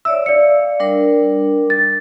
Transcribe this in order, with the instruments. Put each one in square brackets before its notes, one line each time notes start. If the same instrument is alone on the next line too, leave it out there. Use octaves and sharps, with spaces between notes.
[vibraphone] C#5 D5 E5 [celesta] E6
[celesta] D5 C#7 [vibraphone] F5
[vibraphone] G3 D4 A#4
[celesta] A6